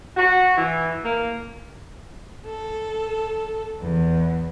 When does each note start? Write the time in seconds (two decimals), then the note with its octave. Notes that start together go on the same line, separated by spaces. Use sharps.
0.16 F#4
0.56 E3
1.04 A#3
2.44 A4
3.82 E2